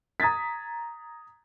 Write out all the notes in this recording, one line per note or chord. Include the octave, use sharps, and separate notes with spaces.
A#5 D#6 G#6 A6 B6